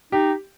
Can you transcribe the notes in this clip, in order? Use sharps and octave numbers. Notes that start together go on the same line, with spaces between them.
D#4 G4